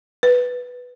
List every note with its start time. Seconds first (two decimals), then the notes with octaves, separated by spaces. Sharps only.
0.23 B4